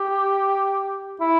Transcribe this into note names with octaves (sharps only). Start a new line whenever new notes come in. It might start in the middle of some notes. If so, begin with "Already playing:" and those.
Already playing: G4
E4